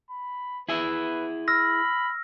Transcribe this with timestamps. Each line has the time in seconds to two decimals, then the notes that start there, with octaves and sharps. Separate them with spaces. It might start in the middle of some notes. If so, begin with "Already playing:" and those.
0.10 B5
0.69 E4 G#4 B4 E5
1.48 B5 E6 F6 A#6